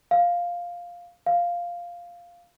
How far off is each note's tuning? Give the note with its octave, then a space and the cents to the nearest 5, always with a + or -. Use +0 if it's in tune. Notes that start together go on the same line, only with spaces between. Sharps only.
F5 +5
F5 +0